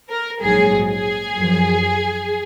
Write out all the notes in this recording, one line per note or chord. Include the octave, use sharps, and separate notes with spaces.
A#4
A#1 G#2 F#3 G#4
G#4
F#2 F3